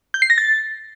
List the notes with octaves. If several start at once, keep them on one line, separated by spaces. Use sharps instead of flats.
G6
C7
A#6
A6